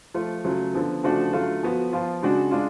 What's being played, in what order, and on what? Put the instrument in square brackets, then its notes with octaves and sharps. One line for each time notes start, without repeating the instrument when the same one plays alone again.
[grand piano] F3 A3 F4
C#3 F#3 A3 F4
D3 F3 B3
C#3 F3 A3 D4 F#4
D3 F#3 A3 F4
F3 B3 F#4
F3 B3 F4
C#3 G#3 D4 F#4
G#3 D4 F4